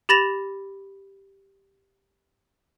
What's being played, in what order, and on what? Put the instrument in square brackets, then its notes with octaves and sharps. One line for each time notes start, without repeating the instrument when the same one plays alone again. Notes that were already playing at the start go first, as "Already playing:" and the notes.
[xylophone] G4 B5 A6 A#6 E7 F7